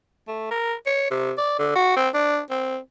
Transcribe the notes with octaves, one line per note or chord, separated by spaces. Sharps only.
A3
A#4
C#5
C3
D5
D3
F#4
C4
D4
C4